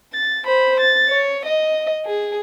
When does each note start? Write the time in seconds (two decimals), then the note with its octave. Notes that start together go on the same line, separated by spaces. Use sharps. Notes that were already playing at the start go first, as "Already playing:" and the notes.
0.13 A6
0.45 C5 B5
0.80 A6
1.09 C#5
1.46 D#5
2.06 G#4